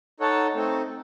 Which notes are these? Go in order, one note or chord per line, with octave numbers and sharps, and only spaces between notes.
D#4 A4 C#5 F#5 A5
A3 C4 D#4